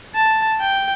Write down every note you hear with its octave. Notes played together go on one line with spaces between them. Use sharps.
A5
G5